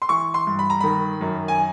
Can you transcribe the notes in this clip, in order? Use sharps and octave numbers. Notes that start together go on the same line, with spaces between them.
C6
E3 C#6
C6
G2
B5
A#5
D#3 B5
F#2
G#5